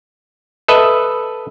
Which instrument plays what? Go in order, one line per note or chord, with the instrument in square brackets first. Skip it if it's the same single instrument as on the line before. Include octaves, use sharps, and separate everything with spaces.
[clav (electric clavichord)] A4 B4 D#5 E5